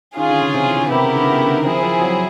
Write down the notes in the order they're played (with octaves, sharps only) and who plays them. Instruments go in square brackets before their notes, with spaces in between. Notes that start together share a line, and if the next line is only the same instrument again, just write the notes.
[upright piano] D#3 [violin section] C#4 F4 G#4
[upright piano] D3
C#3
C3
E3
D3
[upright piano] C3 [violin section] B3 E4 G4 A#4
[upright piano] C#3
D3
C#3
D3
C#3
D3
D#3
[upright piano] F3 [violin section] C4 E4 G#4
[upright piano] F3
F#3